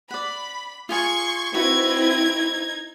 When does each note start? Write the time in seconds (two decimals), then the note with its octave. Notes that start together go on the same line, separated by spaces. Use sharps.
0.11 D5 F#5 B5
0.89 F4 G#4 G#5 C6 C#6 G#6
1.54 C4 D#4 E4 F#4 B4 G5 G#6